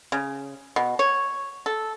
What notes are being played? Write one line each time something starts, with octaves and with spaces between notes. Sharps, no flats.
C#3
B2
C#5
A4